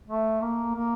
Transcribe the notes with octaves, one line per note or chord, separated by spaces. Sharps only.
A3
A#3
A#3